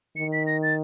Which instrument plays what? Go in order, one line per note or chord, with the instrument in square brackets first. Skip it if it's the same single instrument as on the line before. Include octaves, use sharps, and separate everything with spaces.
[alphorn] D#3 [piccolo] C#7
[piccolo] B6
A#6
A6